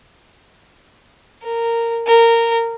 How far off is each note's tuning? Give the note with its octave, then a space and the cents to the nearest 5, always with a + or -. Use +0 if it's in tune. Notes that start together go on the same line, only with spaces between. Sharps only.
A#4 -10
A#4 -15